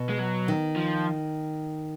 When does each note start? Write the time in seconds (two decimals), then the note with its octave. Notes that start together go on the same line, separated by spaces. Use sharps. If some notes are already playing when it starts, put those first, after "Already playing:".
Already playing: B2
0.10 G#3
0.19 F#3
0.48 D#3
0.76 F3